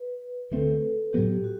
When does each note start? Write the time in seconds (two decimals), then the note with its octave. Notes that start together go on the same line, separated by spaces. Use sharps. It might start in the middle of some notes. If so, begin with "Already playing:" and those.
Already playing: B4
0.51 D2 D3 A3 C4 A4
1.13 A2 F#3 B3 G4
1.44 F#4